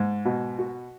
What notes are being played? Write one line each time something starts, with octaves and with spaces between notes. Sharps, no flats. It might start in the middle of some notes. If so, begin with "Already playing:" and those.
Already playing: G#2
B2
F#4